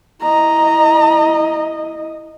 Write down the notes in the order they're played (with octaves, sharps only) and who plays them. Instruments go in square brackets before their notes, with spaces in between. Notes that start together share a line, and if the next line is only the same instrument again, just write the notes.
[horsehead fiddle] E4 D#5 [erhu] A#5